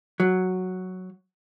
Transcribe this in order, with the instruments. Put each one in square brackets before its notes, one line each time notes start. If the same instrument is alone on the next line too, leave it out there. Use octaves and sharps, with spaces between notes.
[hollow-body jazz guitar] F#3